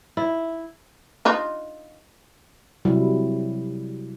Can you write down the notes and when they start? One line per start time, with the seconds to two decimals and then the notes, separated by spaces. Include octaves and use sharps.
0.17 E4
1.25 D4 D#4 F4
2.85 C3 F#3 G3 E4